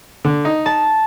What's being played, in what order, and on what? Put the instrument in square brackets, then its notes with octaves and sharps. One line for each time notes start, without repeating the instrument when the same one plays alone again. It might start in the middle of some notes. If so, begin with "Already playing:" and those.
[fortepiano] D3
D#4
[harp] A5